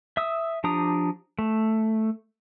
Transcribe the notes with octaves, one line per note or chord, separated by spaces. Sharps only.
E5 D#6 E6
F3 D4 G4 A#5 D#6
A3